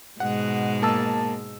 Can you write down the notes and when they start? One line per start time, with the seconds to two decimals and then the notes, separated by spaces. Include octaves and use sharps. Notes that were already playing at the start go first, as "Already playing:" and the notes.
0.20 G#2 B2 G#3 F#5
0.82 A#3 A5 E6